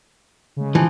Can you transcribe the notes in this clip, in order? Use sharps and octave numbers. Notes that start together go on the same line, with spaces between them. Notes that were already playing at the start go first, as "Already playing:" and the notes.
C#3 G#3
E3 F3